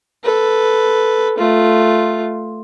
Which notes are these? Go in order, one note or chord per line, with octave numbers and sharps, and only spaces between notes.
A4 B4
A3 F4